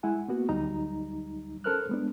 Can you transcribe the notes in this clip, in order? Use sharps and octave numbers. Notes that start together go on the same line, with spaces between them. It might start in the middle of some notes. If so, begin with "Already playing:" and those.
G#3 E4 F#5 G#5
A#3 B3 F#4
D2 F#3 G3 D#4 A#5
C#4 A4 A#4 C5 F6 F#6
G#3 B3 D4